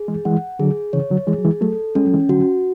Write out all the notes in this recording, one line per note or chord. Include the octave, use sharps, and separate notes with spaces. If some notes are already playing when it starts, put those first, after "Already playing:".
Already playing: G#4
E3 G#3
E3 G#3 F#5
D3 F#3 G#4
C#3 E3 C#5
D3 F#3
E3 G#3 G#4
F#3
E3 G#3
F#3 A3 A4
G#3 C#4
F#3
E3 G#3
D3 F#3 F#4